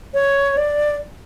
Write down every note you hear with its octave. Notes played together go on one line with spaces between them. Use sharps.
C#5
D5